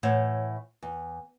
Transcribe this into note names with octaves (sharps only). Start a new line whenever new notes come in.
A2 E3 C5 C#5 F#5
E2